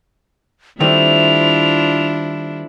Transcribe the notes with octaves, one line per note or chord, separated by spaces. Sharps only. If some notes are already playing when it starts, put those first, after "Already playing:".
D#3 G3 A3 C4 D4 E4 F4 F7